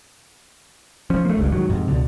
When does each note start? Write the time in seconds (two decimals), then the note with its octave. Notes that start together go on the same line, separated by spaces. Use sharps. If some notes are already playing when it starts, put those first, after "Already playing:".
1.10 F3 C#4
1.25 A3 A#3
1.37 G1 C#2 G2
1.52 G#2 D#3 F#3
1.69 F2 G#2 C3
1.87 C#2 B2 D3